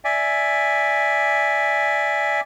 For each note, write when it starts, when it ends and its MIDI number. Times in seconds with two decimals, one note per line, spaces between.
0.05 2.41 74
0.05 2.41 76
0.05 2.41 80